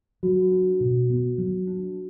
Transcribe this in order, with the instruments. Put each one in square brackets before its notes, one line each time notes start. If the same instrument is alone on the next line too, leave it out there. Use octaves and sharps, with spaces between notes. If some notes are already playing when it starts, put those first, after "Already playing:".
[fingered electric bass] F#3 [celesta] F#4
[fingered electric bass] D4
B2
B3
F#3
D4